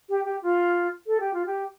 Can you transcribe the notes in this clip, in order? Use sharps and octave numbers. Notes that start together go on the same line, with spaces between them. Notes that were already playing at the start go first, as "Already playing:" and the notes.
G4
G4
F4
A4
G4
F4
G4